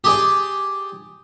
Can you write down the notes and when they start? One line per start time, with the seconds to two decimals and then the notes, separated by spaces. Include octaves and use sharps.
0.04 G4 G#4 D5